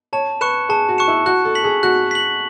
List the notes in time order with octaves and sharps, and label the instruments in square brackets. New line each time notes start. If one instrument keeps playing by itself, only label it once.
[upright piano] C#5 [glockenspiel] A5
[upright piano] B4 [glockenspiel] C#6 F#6 C#7 E7
[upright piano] G#4 [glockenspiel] A5
[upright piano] F#4
[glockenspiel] C#6 F#6 C#7 E7
[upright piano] E4
[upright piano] F#4 [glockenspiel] F#6
[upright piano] A4
[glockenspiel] B6 F#7
[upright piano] G#4
[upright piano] F#4 [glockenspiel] F#6
[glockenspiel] B6 F#7